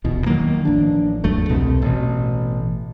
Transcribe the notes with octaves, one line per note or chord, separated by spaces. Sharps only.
D#1 E2 B2 E3
D#3 E3 F#3 A#3
A1 F3 D4
G#1 E2 F#3 A3
C2 B2 A3 C4
A1 B2